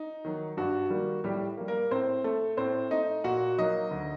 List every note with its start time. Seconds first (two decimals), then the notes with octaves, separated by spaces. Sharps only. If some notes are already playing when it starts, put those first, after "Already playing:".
Already playing: D#4
0.25 D#3 F#3
0.57 G2 F#4
0.90 D#3 G3 A#3
1.24 A2 G3 G4
1.57 A#3
1.61 G3
1.68 A#3 A#4
1.91 A2 C4 C5
2.24 A3 A4
2.57 A2 C4 C5
2.91 A3 D#4 D#5
3.24 A#2 F#4 F#5
3.58 F#3 A#3 D#4 D#5
3.91 D2